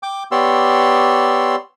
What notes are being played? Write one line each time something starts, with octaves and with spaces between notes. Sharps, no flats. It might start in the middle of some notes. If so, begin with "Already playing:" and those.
G5 D6
B3 G4 C#5 D5 C6 E6